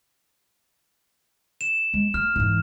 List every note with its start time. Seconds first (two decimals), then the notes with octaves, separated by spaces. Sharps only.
1.61 E7
1.94 G#3
2.14 A3 F6
2.36 G#2 E3